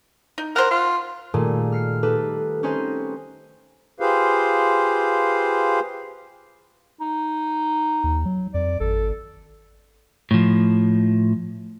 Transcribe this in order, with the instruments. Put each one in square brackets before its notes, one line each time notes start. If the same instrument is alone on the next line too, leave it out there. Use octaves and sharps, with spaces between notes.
[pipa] D#4
[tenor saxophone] A#4 [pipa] C5 F#5
[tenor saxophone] F4
[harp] A#2 D#3 G3 A3 G#4
F6 C7 C#7
D#4 G4 A4 B4
C4 C#4 D#4 B4 C5
[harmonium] F4 G4 G#4 B4 C5 F5
[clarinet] D#4
[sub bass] D#2
F#3
[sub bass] F2 [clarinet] D5
[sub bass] G#1 [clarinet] A4
[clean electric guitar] A2 F3